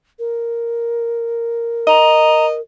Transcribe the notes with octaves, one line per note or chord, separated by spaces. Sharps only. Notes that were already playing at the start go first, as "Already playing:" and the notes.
A#4
D#5 A#5